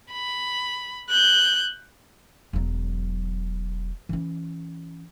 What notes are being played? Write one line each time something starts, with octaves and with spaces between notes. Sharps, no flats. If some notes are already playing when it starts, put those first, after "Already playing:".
B5
F#6 G6
E1 F#3
E3 C#4